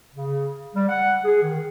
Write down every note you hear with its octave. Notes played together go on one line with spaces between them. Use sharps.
C#3
G3
F#5
G#4
D#3